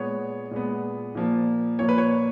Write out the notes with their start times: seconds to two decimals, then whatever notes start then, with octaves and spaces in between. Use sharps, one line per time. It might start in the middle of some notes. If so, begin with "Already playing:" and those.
Already playing: A#2 G#3 B3 C#5
0.51 A#2 G#3 B3
1.15 A#2 F3 A#3
1.79 A#2 F3 A#3 C#5
1.89 B4
1.98 C#5